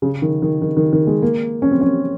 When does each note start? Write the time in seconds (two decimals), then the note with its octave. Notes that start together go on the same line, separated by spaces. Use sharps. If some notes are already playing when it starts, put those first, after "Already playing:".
0.02 C#3
0.22 D#3
0.42 D#3
0.62 D#3
0.77 D#3
0.93 D#3
1.07 G#3
1.22 A#3
1.62 C#4
1.71 C4
1.81 C#4